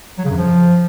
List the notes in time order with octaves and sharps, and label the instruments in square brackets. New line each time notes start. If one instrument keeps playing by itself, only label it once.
[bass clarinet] F#3
C#3
F#2
F3